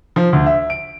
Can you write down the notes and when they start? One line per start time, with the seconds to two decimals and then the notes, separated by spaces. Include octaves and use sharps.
0.16 F3
0.33 D2
0.46 E5
0.70 D7